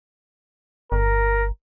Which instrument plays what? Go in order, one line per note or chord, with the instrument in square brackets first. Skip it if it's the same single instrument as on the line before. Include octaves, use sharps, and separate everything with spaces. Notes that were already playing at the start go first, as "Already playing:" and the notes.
[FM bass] G1 [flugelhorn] A#4